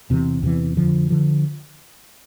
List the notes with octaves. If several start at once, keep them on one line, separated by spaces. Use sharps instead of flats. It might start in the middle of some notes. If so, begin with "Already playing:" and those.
E2 C3 E3
E2 C3 E3
F2 D3 F3
D3 F3